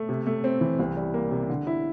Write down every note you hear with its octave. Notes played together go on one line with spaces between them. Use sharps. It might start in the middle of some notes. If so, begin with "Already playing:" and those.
Already playing: A3
C3
A3
C4
E3
C2
G3
A#3
C3
D3
E4